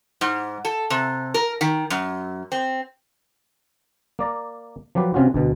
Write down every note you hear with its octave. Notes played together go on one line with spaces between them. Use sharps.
G#2
A4
C3
A#4
D#3
F#2
C4
A#3 D5 A#5
F3 F#3 G4 B4
C3 C#4 F4 F#4
D2 B2